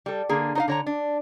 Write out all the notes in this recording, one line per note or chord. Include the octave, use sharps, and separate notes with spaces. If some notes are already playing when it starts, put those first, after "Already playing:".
G3 A4
D3 A#3 G#4
D#4 C5 F5
D3 C#5 A#5
D4